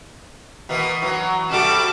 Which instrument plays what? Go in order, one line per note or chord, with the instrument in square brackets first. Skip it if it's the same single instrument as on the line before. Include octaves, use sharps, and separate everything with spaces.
[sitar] B2 E3 A#3
E3 F#3
[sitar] C3 G3 F#4 [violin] A4 D6